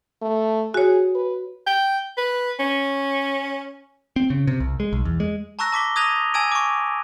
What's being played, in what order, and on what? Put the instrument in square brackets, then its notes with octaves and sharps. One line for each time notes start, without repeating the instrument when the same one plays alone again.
[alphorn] A3
[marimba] F#4 C#5 [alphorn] G#4
[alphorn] B4
[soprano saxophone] G5
B4
C#4
[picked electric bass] C4
C#3
C3
C2
G#3
B1
E2
G#3
[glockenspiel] A5 A#5 C#6 E6 F#6 A#6
A5 D6 B6 G7
D#6 F#6 G#6 A#6 D#7 F7
G#5 A5 E6 G#6 D7 D#7
C#6 D6